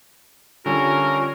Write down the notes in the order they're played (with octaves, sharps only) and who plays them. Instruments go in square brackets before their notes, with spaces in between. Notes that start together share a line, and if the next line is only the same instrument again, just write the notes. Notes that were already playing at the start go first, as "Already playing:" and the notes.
[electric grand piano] D3 G3 [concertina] C#4 [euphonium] F4 [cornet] A#4